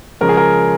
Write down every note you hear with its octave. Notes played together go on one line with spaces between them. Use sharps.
C#3 F3 G#3 C#4 A#4
G#4
A#4